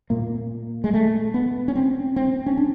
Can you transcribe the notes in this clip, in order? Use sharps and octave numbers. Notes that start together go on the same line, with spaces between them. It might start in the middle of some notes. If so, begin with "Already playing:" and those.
A#2 A#3
G#3
A3
B3
C#4
C4
C4
C#4
D4